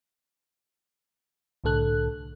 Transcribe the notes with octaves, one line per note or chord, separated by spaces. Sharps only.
C2 A2 D3 A4 F#6